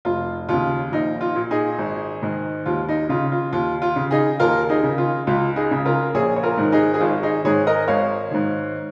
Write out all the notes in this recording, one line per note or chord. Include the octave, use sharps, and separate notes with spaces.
F1 F4
D#2 C#3 F4
A#1 D#4
F4
A#2
D#4 G#4
G#1
G#2 D#3
D#2 F4
D#4
C#3 F4
F4
D#2 F4
F4
C#3
D#4 G#4
D#2 F4 A#4
D#4 G#4
C#3
F4
C#2 F4
D#4 G#4
C#3
F4 A#4
A#1 G#4 C#5
C#5
F4 A#4
G#2 D#3
D#4 G#4
G#4
G#1 F4
D#4 G#4
G#2 D#3 G#4 C#5
A#4 D#5
G#1 C#5 F5
G#2 D#3